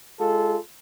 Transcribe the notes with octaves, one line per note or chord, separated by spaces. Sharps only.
G#3 F4 G#4 A4